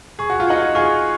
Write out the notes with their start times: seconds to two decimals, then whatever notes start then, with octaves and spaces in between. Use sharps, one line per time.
0.19 G#4 C#6
0.30 F#4
0.40 F4
0.47 D#4 F#4 G#6 C#7 F#7
0.75 F4 G#4 C#6